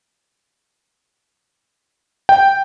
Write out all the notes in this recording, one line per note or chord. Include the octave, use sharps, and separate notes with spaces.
G5